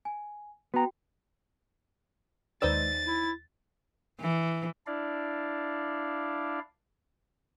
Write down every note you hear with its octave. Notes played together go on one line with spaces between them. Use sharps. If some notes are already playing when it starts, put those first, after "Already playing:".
G#5
B3 F#4 G5 A#5
D#2 G#3 D#4 B4 C5 D5 E6 A6
E4
E3
D4 E4 D5 F5